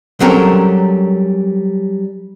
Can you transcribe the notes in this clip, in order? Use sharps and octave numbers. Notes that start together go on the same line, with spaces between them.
F#3 G3 C4 C#4 A4 A#4